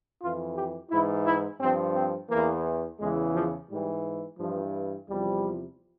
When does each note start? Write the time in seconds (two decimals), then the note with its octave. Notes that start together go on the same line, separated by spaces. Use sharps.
0.21 F2 E3 F4
0.56 G4
0.90 G#2 E3 E4
1.26 E4
1.60 G2 F3 C4
1.95 C4
2.30 E2 E3 A#3
2.99 E2 C#3 E3 G#3
3.34 F3
3.69 G#2 E3 G3
4.39 G2 E3 F3
5.08 E2 C3 F3 G3